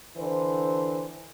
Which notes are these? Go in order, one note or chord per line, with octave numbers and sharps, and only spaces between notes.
D3 E3 C5